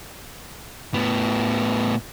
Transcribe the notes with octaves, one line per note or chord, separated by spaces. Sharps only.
A2 B3